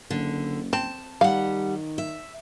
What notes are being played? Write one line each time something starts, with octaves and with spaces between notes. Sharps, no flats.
F#1 D3
C4 A5
D#3 G3 F5 F#5
E5